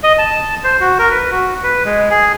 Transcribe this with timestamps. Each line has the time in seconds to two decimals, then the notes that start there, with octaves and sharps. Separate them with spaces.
0.03 D#5
0.18 A5
0.64 C5
0.81 F#4
0.99 A#4
1.11 B4
1.31 F#4
1.63 B4
1.85 G#3
2.10 G#4